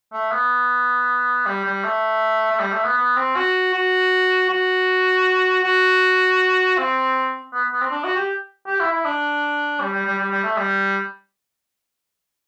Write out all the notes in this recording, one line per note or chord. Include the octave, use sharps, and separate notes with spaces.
A3
B3
G3
G3
A3
A3
G3
A3
B3
B3
C4
F#4
F#4
F#4
F#4
C4
B3
B3
C4
D4
F#4
G4
G4
E4
E4
D4
G3
G3
G3
G3
G3
A3
G3